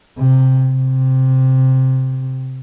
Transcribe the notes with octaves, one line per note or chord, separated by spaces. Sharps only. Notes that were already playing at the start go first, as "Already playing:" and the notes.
C3
C3